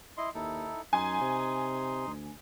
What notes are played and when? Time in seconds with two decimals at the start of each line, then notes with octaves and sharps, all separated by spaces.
0.18 E4 D#5 C6
0.35 D#2 D#4 E4 A4
0.93 F#2 D#4 G#5 C6 D#6
1.21 C3
2.07 D2